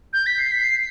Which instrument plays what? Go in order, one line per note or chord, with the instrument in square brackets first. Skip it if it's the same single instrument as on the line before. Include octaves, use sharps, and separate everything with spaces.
[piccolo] G6
B6
C7
B6
C7